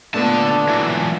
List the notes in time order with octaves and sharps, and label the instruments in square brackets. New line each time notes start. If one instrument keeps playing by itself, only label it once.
[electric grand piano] A#2 A3 B3 [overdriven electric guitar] D3 A5 [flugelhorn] D4
[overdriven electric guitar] E3 F#3